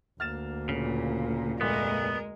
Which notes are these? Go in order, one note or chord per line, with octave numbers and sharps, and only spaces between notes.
D2 A#3 F6 A6 E7
A#2 C#3
F1 A#2 G#3 A3 B3 A#4